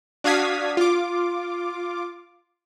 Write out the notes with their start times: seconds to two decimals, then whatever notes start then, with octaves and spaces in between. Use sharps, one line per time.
0.24 D4 F#4 F5 D#6 G#6 B6
0.77 F4 D6